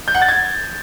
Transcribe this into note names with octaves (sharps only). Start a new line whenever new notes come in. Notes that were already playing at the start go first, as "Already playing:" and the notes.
G6
F#5
A6
G#6